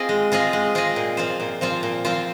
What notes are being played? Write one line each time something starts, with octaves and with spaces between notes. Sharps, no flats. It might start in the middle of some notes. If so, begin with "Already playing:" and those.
Already playing: C4 F4 G#4 D#5
G#3
C4 F4 G#4 D#5
G#3
C4 F4 G#4 D#5
A#2
F3 C4 F4 C5
A#2
F3 C4 F4 C5
A#2
F3 C4 F4 C5